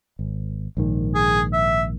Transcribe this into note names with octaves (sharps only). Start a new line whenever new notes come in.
G#1
A#1 G#2 D#3
G#4
E5